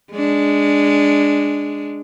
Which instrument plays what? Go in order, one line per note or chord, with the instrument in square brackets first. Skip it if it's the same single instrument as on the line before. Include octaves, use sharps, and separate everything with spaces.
[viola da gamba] G#3 D4